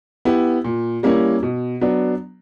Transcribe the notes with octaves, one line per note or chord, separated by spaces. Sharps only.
B3 E4 G4
A#2
G3 A#3 C#4 E4
B2
F#3 B3 D4